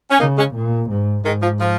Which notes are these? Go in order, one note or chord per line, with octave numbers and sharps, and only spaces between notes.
C#4
C#3 A#3 D#4
G#3 C#4
A#2
G#2
G#2 D#3 G#3
F3
F3